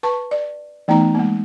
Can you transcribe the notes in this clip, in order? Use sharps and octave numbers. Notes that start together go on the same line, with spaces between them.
B4 A5 C#6
D5
E3 A3 B3 D#4 A#5
G#3 A#3